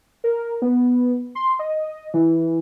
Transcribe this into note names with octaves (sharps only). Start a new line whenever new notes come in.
A#4
B3
C6
D#5
E3